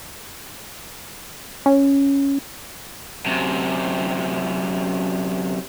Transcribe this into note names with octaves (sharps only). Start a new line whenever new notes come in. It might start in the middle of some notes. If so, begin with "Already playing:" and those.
C#4
F#2 C3